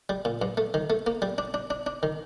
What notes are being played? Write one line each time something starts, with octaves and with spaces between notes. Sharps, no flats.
G3
A#2
G2
A3
D#3
A3
A#3
G3
D4
D4
D4
D4
D#3